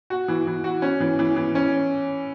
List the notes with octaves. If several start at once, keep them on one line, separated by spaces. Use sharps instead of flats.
F#4
E3
E3
F#4
C#4
E3
E3
E3
C#4